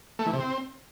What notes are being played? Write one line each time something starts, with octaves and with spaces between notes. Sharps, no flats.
A3
E3
C3
C4